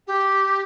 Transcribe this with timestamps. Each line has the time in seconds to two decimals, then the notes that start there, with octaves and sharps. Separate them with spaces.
0.07 G4